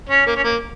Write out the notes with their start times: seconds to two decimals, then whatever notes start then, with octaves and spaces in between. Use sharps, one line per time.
0.09 C#4
0.26 A#3
0.36 C#4
0.44 A#3